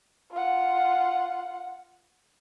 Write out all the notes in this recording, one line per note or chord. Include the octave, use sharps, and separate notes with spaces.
F4 F#5